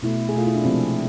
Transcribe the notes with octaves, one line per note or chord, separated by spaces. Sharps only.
B2 A3 E4
G#4
B2 A3 F4
E4
D4
C3 F3 G#3 C4